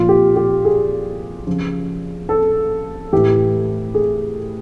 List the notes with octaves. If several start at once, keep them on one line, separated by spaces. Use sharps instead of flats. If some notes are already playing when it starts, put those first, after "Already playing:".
Already playing: A#2 F3 F4
G4
G4
G#4
C#3 F3
A4
A2 E3 G4
G#4